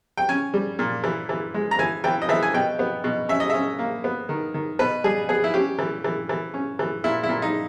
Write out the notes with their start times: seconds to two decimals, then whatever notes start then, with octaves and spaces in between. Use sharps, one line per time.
0.17 G5
0.29 C#4 G#5
0.54 G3
0.79 A#2
1.04 E3
1.29 E3
1.54 G#3
1.71 A#5
1.79 E3 G#5
2.04 E3 G5
2.22 D#5
2.29 E3 E5
2.43 G#5
2.54 B2 G5
2.79 B3
3.04 B2
3.29 C#4 E5
3.40 D#5
3.50 C#4 E5
3.79 A#3
4.04 B3
4.29 D#3
4.54 D#3
4.79 B2 B4
5.04 G3 G#4
5.29 B3 G#4
5.44 E4
5.54 C#4 G4
5.79 E3
6.04 E3
6.29 E3
6.54 C#4
6.79 E3
7.04 A#2 E4
7.23 E4
7.29 A#2
7.42 D#4